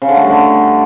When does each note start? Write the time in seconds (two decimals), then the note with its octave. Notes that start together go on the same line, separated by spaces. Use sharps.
0.02 C#3
0.09 D3
0.16 A3
0.23 G3
0.30 D3